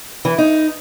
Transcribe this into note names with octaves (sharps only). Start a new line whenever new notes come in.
E3
D#4